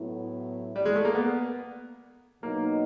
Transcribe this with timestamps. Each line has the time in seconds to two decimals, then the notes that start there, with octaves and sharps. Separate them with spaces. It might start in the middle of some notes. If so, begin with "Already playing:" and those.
Already playing: A2 F#3 B3 E4
0.76 G3
0.86 G#3
0.96 A3
1.05 A#3
1.15 B3
2.43 B2 F#3 A#3 B3 D#4